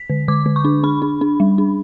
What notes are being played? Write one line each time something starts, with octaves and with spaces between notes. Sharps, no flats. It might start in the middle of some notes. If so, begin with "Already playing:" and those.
Already playing: B6
D3
D3 D6
D3
C#6
D4
D4 B5
D4
D4
G3
D4